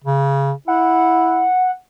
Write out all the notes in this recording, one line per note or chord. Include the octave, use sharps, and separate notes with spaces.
C#3
E4 F#5